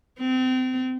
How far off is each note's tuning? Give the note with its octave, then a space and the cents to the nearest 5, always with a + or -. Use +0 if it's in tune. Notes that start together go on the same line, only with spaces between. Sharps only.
C4 -30